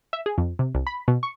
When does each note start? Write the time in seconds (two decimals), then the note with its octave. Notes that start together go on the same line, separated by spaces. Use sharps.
0.13 E5
0.26 G#4
0.38 F2
0.59 C3
0.75 C2
0.87 B5
1.08 B2
1.23 C#6